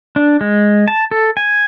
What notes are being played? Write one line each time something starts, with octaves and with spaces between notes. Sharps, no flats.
D4
G#3
A5
A4
G#5